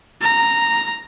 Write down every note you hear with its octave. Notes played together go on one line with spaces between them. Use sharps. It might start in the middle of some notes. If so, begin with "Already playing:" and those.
A#5